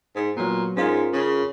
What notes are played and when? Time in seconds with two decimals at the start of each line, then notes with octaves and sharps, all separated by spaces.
0.16 G#2
0.37 A#2 F#3 B3
0.77 G#2 C#4 F4 A#4
1.13 C#3